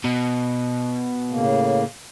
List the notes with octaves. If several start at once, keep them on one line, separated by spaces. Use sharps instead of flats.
B2
A2 C#3 A#3